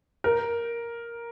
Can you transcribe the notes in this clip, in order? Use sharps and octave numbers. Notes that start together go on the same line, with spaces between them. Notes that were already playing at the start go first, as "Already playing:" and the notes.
A#4